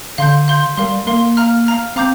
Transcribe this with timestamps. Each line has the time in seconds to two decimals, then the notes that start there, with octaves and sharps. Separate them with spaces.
0.18 D3 F5 C6 G6
0.48 F5 C6 G6
0.77 G3 A#4 F5 C6
1.07 A#3 A#4 F5 C6
1.37 F5 A#5 F6
1.67 F5 A#5 F6
1.96 C4 F5 A#5 D6 G6